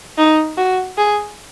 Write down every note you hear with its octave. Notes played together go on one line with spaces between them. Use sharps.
D#4
F#4
G#4